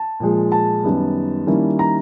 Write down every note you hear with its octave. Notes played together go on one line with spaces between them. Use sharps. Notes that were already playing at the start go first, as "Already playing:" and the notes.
Already playing: A5
A#2 F3 G#3
A5
F#2 D#3 G3 B3
D#3 G3 A#3 C#4 E4
A#5